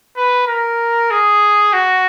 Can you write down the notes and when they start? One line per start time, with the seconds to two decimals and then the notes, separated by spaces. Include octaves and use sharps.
0.17 B4
0.48 A#4
1.11 G#4
1.73 F#4